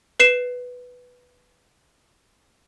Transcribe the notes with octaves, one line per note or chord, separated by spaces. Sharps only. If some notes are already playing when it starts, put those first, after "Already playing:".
B4 C7 E7